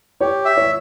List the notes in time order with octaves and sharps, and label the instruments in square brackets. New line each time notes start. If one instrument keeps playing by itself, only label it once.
[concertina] G4 [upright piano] C#5
[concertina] E5
[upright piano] C#5